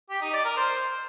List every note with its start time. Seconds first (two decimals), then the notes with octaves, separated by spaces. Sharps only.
0.10 G4
0.21 D#4
0.33 D5
0.45 A#4
0.56 C5